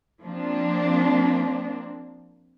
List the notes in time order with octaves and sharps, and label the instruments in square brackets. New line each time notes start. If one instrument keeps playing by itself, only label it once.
[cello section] F3 A#3 C4 D4